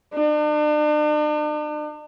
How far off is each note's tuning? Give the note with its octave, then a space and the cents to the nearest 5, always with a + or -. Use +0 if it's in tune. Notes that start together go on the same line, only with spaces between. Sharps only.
D4 +40